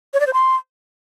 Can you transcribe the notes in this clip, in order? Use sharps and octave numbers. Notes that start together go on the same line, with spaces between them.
C#5
D5
C5
C6